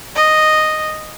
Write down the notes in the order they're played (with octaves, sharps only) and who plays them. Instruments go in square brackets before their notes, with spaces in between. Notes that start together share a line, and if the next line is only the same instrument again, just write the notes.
[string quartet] D#5